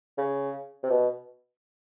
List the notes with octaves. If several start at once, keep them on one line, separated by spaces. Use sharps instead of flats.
C#3
C3
B2